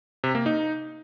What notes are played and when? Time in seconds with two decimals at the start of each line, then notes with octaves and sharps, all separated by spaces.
0.24 C3
0.35 A#3
0.46 D#4